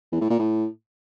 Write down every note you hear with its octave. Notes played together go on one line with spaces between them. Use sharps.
E2
A2
A#2
A2